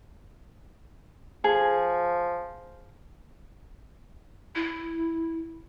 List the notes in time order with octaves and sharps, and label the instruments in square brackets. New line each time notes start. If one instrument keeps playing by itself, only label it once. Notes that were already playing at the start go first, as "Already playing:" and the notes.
[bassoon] F3 [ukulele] G#4
[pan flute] E4